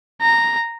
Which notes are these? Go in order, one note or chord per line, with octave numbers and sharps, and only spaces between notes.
A#5